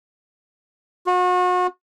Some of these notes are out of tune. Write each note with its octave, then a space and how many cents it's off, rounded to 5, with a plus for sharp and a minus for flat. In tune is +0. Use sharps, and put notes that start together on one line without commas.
F#4 -35